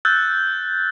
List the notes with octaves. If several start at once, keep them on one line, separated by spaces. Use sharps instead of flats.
E6 F#6 G6 A6